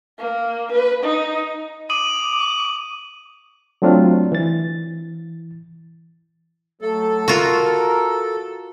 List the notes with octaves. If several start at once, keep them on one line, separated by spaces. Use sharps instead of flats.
A#3
B4
D#4
D6 D#6 D#7 F#7
F#3 A3 C4 D4 F4
E3 A6
F#3 A3 A4
F4 F#4 A#4